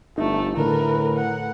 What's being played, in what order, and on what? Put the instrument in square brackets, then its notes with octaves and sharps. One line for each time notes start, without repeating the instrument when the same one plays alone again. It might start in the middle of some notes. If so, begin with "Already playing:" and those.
[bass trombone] G1 [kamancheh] A3 [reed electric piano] D#4
[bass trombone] A2 [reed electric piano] D3 [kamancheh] A#4 B4
[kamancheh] F#5